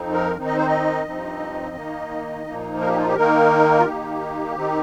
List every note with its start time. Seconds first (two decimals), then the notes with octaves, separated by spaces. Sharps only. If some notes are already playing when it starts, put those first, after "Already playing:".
Already playing: F2 F3 C4 D#4
0.13 A#4
0.36 D#3 C4 D#4
0.46 D#5
0.57 C5
0.67 D#5
1.06 G2 F3 C4 D#4
1.76 D#3 A#3 D#4
2.46 A#2 F3 A#3 D#4
2.81 A#4
2.89 G4
2.98 F4
3.07 G4
3.16 D#3 A#3 D#4 A#4
3.80 F4
3.85 D#3 A#3 D#4 G4
4.55 D#3 C4 D#4